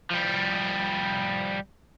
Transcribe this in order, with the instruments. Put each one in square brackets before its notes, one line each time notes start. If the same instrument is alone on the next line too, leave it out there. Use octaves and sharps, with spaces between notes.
[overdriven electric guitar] F3 G3